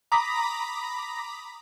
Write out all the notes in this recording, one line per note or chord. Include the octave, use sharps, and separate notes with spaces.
A#5 B5 D6 D#6 A#6 B6